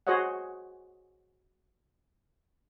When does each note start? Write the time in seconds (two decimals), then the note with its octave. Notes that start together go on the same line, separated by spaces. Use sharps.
0.07 F#4 G#4 C5 C#5 D#5 F#5